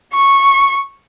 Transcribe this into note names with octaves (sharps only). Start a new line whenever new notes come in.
C#6